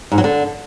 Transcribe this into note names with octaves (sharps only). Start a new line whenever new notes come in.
G#2
F#3
D3